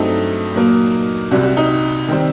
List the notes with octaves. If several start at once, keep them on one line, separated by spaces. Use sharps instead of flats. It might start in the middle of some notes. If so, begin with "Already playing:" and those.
Already playing: G2 F#3 A3 C4 D#4
A#2 F#3 A#3
C2 C3 G3 F#4
F#4
D#4
D#3 G3 C4